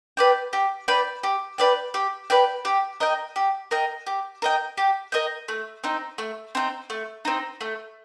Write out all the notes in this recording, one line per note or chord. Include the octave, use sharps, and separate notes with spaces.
B4 D5 G5
G4
B4 D5 G5
G4
B4 D5 G5
G4
B4 D5 G5
G4
A#4 D#5 G5
G4
A#4 D#5 G5
G4
A#4 D#5 G5
G4
A#4 D#5 G5
A3
C4 D#4
A3
C4 D#4
A3
C4 D#4
A3